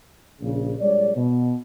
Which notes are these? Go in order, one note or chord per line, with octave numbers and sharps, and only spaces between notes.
A#1 C#3
A#1 G3 G#3 C#5 D5
B2